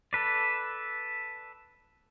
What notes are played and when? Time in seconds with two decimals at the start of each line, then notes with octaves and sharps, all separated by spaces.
0.13 A4 B4 D5